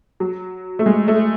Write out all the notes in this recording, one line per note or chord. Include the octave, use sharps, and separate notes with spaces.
F#3
A3
G#3
A3